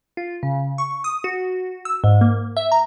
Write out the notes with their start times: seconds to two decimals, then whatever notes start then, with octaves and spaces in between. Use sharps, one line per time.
0.17 F4
0.43 C#3
0.78 C#6
1.04 D#6
1.24 F#4
1.85 E6
2.04 G#2
2.21 A#3
2.57 E5
2.72 A#5